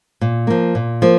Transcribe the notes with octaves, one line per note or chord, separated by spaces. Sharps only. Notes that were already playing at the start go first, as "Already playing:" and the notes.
A#2
F3 A#3
A#2
F3 A#3